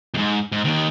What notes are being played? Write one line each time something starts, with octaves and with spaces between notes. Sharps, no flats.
F2 G#2
G#2
D#2 D#3